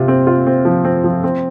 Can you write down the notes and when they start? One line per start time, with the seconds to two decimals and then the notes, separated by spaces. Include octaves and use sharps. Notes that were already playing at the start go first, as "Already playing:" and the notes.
Already playing: C3 F4
0.08 C4
0.27 F4
0.47 C4
0.65 F3
0.85 C4
1.04 F3
1.24 C4